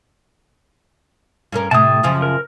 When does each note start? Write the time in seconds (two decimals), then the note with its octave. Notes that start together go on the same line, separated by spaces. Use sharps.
1.52 G2 C#4 A#4
1.71 A2 C3 A5 D#6
2.03 F#2 C#3 F3
2.22 A#4